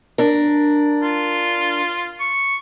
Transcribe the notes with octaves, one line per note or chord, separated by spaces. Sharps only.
D4 A#4
F4
C#6